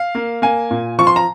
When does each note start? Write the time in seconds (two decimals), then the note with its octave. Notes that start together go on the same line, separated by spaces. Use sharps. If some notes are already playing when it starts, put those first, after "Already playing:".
Already playing: F5
0.15 A#3
0.42 A#3 G#5
0.71 A#2
0.98 F3 C#6
1.07 C6
1.16 A#5